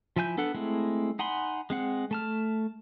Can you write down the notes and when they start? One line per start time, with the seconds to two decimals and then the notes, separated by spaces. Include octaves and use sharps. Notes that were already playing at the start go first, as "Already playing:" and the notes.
0.16 F3 E4 G#5 G6
0.37 B3 D4 A4 F#5
0.55 G#3 A3 C4 E4
1.19 D#4 F#5 G#5 B5 C6
1.70 G#3 C4 F#5
2.11 A3 A5 F6